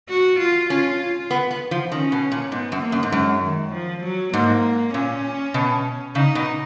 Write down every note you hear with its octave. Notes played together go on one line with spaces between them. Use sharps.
F#4
F4
C#4 F4
B3
B3
F3
D#3 C#4
B2
A#2
G#2 B3
F#2
A#3
F#2
G#2
F#2 G#3
D#3
F3
F#3
G#2 A#3
A#2 C#4
B2
C#3 D#4
B2